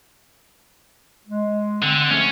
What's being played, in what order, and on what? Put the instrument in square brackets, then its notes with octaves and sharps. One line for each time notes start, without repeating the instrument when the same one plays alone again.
[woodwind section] G#3
[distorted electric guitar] D3 [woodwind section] C4
[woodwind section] C#3 F3 A3 [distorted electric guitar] C#4